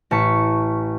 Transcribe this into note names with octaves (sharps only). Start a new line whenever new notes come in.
A1 A5 C#6 B6